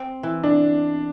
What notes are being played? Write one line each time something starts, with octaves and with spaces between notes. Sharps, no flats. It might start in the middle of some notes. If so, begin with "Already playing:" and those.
Already playing: C4
E3
D4